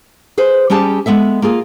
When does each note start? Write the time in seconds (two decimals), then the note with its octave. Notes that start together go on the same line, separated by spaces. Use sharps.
0.37 G#4 B4 C5
0.70 G3 C#4 G4 G#4 A5
1.06 G#3 B3 A4 E5
1.42 A#3 F4 G#4